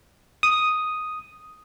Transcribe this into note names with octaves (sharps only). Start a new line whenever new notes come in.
D#6